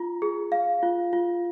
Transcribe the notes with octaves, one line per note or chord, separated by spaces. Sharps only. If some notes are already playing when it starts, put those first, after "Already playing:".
Already playing: F4 A#5
G#4
F5
F4
F4